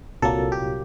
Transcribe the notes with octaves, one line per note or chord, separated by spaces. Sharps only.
C2 A#2 F#3 A#3 A4
G4